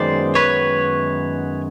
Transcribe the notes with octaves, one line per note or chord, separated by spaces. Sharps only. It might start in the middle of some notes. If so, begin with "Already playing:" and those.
Already playing: F#2 D#3 G#3 B3 C5 D5
B4 C#5